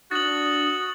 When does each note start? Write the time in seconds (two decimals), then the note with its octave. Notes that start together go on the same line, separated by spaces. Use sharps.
0.11 D4 F#4 D#6 A6 F#7